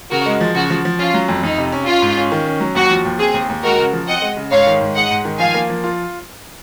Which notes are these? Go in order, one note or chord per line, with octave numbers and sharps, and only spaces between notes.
C#3 F#4 A#4
G#3
F3
C#3 F#4
F3
F3
C#4 F4
F#3
F2
F2 D#4
C3
C#4
C#4 F4
G#2
C#4
D#3
C#4
F#3
D#2 F#4
F3
D#2
C4 G#4
D#2
D#2
G#3 F#4 A#4
C#3
F3
C4 D#5 F#5
G#3
C#3
G#2 C#5 F5
D#3
G#2
G#3 D#5 F#5
G#2
D#3
F3 F5 G#5
A#3
F3
F4